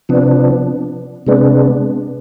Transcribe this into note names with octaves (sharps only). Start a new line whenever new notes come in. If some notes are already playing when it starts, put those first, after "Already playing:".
C3 F3 B3 D4
C3 G#3 B3 D4